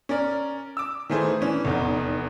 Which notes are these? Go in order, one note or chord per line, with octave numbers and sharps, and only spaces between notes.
C#4 A#4 D5
D6 E6
D#3 E3 A3 G#4 C5
E3 C#4 D4
F1 E2 D#4